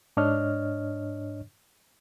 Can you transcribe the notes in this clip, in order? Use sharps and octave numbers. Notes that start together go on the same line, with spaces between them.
G#2 D4 C#5 D#5 F6